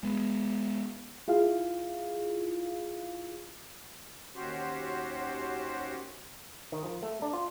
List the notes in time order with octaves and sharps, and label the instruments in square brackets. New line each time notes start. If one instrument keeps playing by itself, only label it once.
[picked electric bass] G#3 B3
[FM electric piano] E4 F4 G#4 F5
[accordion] D#2 C#4 F#4 G4 C5
[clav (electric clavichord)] D#3
F3
A3
D4
F4